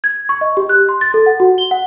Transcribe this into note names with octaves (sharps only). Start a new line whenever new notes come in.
G#6
C#6
D#5
G4
F#6
C6
A6
A4
F#5
F#4
G7
F#5